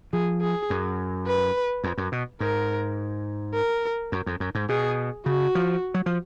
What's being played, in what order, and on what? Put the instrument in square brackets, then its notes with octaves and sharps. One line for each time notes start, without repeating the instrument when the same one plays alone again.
[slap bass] F3 [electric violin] G#4
[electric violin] G#4
[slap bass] F#2
[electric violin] B4
[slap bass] F2
F#2
B2
[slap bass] G#2 [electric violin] A#4
[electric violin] A#4
[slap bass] F#2
F2
F#2
G#2
[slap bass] B2 [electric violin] G#4
[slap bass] C#3 [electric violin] F#4
[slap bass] F3
F#3
F3